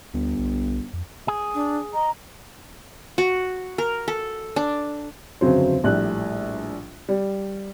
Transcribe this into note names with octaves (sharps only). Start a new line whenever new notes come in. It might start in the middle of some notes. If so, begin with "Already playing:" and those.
G1 D2
B1
F2
G#4
D4
D#5 A#5
F#4
A#4
A4
D4
G1 F2 C#3 F#3 C5
A#1 A2 G3 F#6
G3